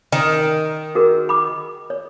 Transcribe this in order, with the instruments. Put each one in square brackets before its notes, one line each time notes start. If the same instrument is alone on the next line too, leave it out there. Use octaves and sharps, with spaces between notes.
[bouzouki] D#3
[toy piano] F#4 G#4 A#4
B5 D6
C#5